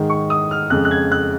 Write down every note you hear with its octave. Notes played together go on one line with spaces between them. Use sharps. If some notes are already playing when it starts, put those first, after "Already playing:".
Already playing: G#2 D#3 G#3 D#4
C#6
D#6
F6
F2 C#3 G#3 F#6
F#6
G#6
F#6